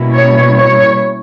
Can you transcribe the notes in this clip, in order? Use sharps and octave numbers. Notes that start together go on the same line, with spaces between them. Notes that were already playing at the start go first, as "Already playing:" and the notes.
Already playing: B2 G3 A#3 C#4 E4
C#5
C#5